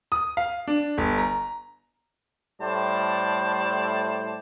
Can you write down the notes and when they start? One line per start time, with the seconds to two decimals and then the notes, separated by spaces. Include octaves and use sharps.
0.12 D#6
0.37 F5
0.68 D4
0.98 G1
1.18 A#5
2.61 A2 G3 A3 C5 D5 A5